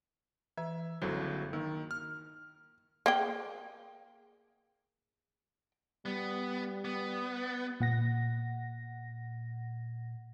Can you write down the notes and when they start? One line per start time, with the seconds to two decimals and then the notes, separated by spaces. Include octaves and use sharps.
0.57 E3 E5
1.02 G1 C#2 F#3 E4 A4 C5
1.53 D#3 A#3
1.91 F6
3.06 A#3 G#4 G5
6.06 G3 B3
6.85 B3
7.80 A#2 F#5 A#6